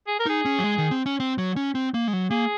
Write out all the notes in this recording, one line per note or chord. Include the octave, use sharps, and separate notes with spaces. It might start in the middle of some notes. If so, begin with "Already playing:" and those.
G#4
A#4
D#4 G#4
C#4
F#3
G#3
D#3
C4
C#4
C4
F#3
C#4
C4
A#3
G#3
F#3
A#3 G#4